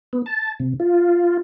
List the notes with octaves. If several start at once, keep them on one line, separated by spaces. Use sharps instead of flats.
B3
A5
C3
F4